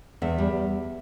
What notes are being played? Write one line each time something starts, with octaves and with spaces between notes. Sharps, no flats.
E2 E5
G3